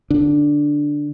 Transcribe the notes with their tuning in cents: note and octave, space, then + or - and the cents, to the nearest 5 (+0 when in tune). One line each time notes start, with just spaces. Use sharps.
D3 +0 D4 +0